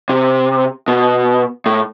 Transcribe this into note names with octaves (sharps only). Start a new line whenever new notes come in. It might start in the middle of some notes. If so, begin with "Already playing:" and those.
C3
B2
A2